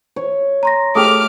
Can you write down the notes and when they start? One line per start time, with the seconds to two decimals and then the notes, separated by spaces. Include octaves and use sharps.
0.16 C#5
0.63 A#5 C6 A#6
0.95 A3 G4 G#4 E5 D6 D#6 F6